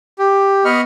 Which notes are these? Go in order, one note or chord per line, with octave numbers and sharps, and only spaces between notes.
G4
B3 D#5 B5 C#6 F6